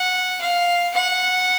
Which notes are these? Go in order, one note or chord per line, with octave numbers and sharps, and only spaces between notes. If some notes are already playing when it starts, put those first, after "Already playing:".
Already playing: F#5
F5
F#5